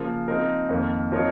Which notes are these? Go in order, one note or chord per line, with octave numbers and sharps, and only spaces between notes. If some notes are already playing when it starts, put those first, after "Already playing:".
Already playing: C#3 F3 A#3
F3 C4 D#4 A#4
F2 D#3 A#3
F3 C4 D#4 A#4 C#5